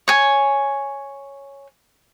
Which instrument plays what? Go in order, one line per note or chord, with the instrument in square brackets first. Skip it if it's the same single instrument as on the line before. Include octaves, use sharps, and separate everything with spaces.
[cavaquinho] C#5 G#5